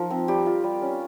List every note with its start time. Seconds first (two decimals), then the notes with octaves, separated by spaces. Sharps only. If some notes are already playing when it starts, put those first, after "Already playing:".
Already playing: F3 D#4 A#4
0.10 C4
0.28 G3 G4
0.46 F4
0.64 G3
0.82 C#4